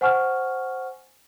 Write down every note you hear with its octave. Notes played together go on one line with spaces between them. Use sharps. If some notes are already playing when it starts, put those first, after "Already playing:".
C5 F#5 G#5 C#6 F6